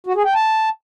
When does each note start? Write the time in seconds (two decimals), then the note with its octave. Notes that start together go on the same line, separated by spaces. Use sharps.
0.07 F#4
0.16 G#4
0.25 G5
0.35 A5